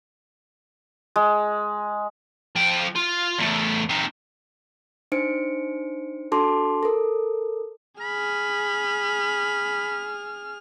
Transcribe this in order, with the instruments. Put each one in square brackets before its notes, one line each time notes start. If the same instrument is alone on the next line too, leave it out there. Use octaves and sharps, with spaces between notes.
[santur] G#3
[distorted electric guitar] F3 G5
F4
E2 A3
C4 D#4
[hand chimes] D4 D#4 C5 C#7 D7
D4 F#4 A4 A5 C6 D6
A4 A#4
[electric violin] G#4 F6 [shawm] B5